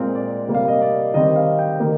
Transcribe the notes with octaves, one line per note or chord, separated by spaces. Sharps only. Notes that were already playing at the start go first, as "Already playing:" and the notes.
Already playing: A#2 G#3 C4 A#4
D5
C3 G3 A#3
F5
D#5
D5
D#3 G3 C4 D#5
F5
G5
D#3 A#3